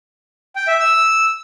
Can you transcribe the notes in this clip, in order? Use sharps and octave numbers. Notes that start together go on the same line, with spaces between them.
G5
E5
E6